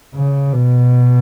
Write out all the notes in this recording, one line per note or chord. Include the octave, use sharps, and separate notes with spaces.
C#3
B2